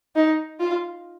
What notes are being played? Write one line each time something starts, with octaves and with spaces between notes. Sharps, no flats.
D#4
F4